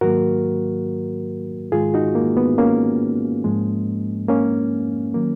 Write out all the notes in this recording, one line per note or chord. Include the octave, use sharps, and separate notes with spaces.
G#2 D#3 F#3 A#3 F#4 A#4
G#2 D#3 G#3 F4 G#4
D#4 F#4
A#3
B3
A#3 C#4
G#2 F3 G#3
A#3 C#4
D#3 F#3 A#3